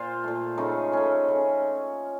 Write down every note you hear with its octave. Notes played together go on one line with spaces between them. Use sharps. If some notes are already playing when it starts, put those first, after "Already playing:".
Already playing: A#2 F4 C5
A#2 A3
C#3 A3 D#4
C#3 A3 C#4
C#3 A3